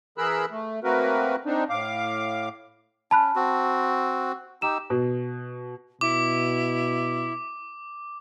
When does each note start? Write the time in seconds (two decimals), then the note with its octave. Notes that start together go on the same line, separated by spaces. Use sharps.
0.18 E3 G#4 A#4 B5 E6 F#6
0.50 A3
0.84 A3 A#3 C4 F#4 A#4 B4
1.45 C4 D4 D#4
1.70 A2 F5 D6
3.11 C#4 A5 B5 F#6
3.35 C4 F#4
4.62 D#4 G4 E6 E7
4.90 B2
6.01 B2 E4 D6